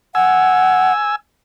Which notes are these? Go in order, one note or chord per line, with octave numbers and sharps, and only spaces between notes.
F#5 G#5 E6